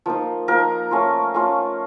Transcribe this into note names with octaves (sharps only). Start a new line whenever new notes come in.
F3 A#3 D#4
F3 A#3 D#4 A#4
A3 C#4 F4
A3 C#4 F4